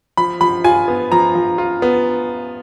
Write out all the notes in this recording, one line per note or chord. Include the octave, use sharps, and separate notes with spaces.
F3 B5
F3 B5
F4 G#5
B3
F3 A#5
F3
F4
B3